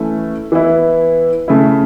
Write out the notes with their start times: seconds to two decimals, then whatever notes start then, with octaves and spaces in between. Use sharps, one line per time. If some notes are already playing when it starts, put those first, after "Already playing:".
Already playing: E3 A3 C#4 E4
0.52 E3 B3 E4
1.48 C#3 A3 E4